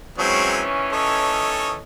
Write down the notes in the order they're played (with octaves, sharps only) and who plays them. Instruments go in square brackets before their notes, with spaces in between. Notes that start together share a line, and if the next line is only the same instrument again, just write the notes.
[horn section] D#3 E3 C#4 [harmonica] F#3 G#3 C4
[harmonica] A4 C#5 D#5